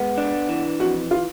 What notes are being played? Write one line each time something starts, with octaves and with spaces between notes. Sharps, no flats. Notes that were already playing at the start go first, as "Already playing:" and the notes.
Already playing: G#3 B3
D4
E3
F2 F#4
F4